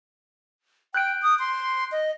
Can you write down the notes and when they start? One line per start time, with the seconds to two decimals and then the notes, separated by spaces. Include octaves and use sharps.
0.94 G5 F#6 G6 D7
1.22 D#6
1.39 C6
1.92 D#5